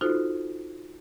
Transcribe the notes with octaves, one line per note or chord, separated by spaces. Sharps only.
D#4 F4 F#4 A4 C5